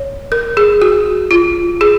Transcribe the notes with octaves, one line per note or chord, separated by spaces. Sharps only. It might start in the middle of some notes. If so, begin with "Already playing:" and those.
Already playing: C#5
A#4
G#4
F#4
F4
G#4